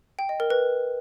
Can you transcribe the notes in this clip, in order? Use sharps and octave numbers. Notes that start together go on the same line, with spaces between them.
G5
D#5
A#4
B4